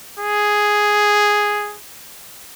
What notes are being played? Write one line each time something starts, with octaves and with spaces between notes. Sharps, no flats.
G#4